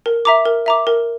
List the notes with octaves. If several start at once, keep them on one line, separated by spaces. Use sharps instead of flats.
A#4
E5 A#5 D6
A#4
E5 A#5 D6
A#4